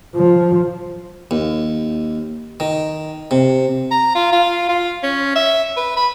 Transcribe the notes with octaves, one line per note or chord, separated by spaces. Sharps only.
F3
D#2
D#3
C3
A#5
F4
F4
F4
C#4
E5
B4
B5